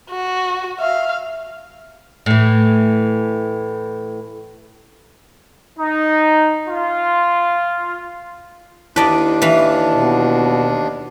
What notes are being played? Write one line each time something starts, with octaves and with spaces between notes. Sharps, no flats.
F#4
E5 F5
A2 E3
D#4
F4
D#2 D4 E4 B4 D5 D#5 A5
E3 B4 F5
B2